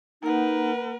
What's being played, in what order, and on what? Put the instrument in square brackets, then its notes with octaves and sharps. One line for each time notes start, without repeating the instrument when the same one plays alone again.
[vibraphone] A#3 F#5 [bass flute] D#4 [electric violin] A#4 B4